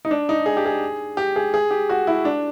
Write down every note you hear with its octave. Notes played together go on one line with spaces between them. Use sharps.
D#4
D4
D#4
G#4
G4
G#4
G4
G#4
G#4
G4
F#4
E4
D4